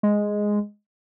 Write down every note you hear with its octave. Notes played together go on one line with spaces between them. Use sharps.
G#3